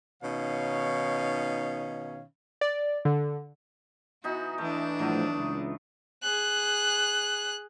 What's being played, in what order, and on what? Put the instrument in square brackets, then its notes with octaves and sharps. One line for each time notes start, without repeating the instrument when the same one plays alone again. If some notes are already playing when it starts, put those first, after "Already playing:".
[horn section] B2 D#3 C#4 D#4 C#5 F5
[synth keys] D5
D3
[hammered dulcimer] E3 B3 D#4 [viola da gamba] F#4
[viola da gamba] E3 D4 [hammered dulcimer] A3
[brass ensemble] A2 F3 [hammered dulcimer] F#3 A3 B3
[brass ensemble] C#2
[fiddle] G#4 F#6